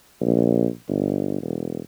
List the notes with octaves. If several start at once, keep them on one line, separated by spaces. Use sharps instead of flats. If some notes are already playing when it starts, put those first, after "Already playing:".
A#1
G1
E1